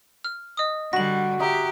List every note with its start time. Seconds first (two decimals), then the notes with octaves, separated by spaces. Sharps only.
0.24 F6
0.57 D#5 D#6
0.93 D3 G3 F#4 A#6 F#7
1.40 G4 G#4 E5 A#5